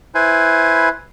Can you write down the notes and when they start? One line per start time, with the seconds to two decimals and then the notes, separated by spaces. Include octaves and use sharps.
0.15 E4 B4 C5 G#5